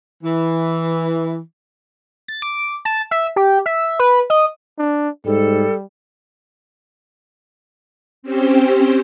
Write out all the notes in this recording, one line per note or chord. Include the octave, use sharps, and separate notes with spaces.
E3
A6
D6
A5
E5
G4
E5
B4
D#5
D4
G#2 G3 A4
C4 C#4 G4 C5